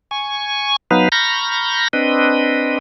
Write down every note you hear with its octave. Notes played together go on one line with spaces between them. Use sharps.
G#5 C#6
F#3 B3 D#4 B4 F5
A#5 B5 C#6 F6 G6 A#6
C4 D4 B4 D#5